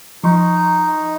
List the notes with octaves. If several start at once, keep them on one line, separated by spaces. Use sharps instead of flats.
F3 D#4 C6 C#6